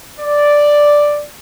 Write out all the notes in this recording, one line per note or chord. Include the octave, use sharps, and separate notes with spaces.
D5